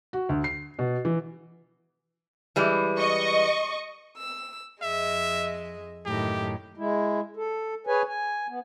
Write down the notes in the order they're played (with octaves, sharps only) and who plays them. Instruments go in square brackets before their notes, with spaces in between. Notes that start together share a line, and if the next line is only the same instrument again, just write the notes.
[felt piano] F#4
D2
C7
B2
E3
[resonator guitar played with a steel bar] E3 G3 G#3
[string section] D#5 C#6
[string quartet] E6
[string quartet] F2 G#3 D#5 [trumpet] E5
[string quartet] F#2 A2 D#3 [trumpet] G4
[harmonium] G#3 E4
A4
G#4 B4 C#5 G#5
G#5
B3